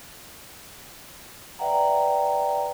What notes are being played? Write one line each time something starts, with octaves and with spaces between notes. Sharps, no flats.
B4 D5 E5 F#5 G5 A#5